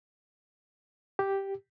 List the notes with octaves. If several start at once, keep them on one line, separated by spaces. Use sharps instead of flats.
G4